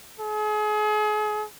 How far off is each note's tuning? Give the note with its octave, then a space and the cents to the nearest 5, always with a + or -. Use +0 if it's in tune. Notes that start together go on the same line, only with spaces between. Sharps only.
G#4 +35